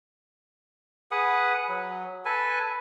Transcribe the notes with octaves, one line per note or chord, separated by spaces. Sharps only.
G#4 B4 F#5 D#6
F#3
A4 B4 G#5